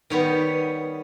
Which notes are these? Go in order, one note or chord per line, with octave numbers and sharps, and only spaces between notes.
D#3 G3 B3 C#5